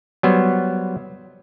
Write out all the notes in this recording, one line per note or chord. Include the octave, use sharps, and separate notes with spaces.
F#3 G3 B3 C5